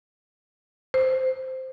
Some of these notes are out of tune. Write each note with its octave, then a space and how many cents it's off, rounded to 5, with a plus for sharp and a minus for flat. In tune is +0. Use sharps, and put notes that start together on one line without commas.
C5 -5